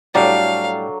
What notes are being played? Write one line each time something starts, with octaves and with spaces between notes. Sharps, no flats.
A2 F#3 G3 D4 A4 D5 F5